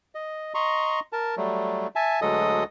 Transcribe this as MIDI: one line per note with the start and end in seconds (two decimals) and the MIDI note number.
0.15 0.54 75
0.54 1.00 75
0.54 1.00 82
0.54 1.00 84
0.54 1.00 85
1.13 1.35 70
1.13 1.35 81
1.37 1.87 54
1.37 1.87 55
1.37 1.87 57
1.96 2.20 76
1.96 2.20 80
1.96 2.20 81
2.22 2.64 38
2.22 2.64 54
2.22 2.64 56
2.22 2.64 69
2.22 2.64 75
2.22 2.64 87